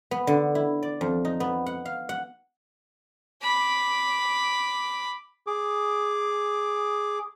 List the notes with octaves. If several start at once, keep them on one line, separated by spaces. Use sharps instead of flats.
B3
D3
E4
D5
F2
D#4
B3
F#5
F5
F#5
B5 D6
G#4 D6